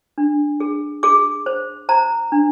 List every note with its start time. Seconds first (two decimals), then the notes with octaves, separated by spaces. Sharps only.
0.18 D4
0.60 G#4
1.03 G#4 D6
1.46 C5
1.89 C5 A#5
2.32 D4